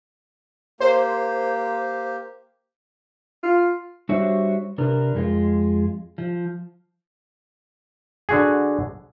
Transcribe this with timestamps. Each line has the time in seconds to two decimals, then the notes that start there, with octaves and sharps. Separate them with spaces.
0.80 A#3 G4 C5
3.43 F4
4.09 G3 D4 F#4 C5 C#5 E5
4.78 C3 D4 A#4 B4
5.15 F2 G#3 F4
6.18 F3
8.29 D3 F#4 G#4